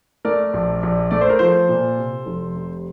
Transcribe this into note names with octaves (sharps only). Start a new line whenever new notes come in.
A3 A#4 D5
A#1
A#1
A3 D5
C5
A#4
F3 A4 C5
A#2
C3
F1
C3